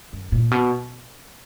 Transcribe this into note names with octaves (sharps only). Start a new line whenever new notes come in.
F#2
A#2
B2